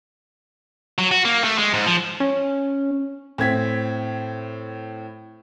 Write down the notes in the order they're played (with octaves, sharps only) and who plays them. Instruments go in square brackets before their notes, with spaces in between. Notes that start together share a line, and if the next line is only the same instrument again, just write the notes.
[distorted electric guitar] F#3
F#4
A#3
A3
G#3
G#2
F3
[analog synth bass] C#4
[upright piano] A2 C4 G#6 B6